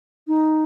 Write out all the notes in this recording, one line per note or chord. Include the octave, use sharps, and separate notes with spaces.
D#4